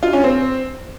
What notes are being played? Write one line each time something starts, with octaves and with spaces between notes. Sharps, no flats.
F4
C#4
C4